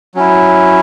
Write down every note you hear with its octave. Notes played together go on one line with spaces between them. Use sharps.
F#3 C#4 E4